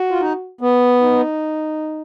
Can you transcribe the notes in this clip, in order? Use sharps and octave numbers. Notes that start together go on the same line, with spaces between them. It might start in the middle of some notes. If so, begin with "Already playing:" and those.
Already playing: F#4
F4
D#4
B3
D#4